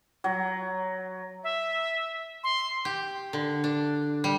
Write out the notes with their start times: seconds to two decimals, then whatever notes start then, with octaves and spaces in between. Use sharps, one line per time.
0.24 F#3
1.44 E5
2.44 C6
2.85 G4
3.33 D3
3.64 D4
4.24 G3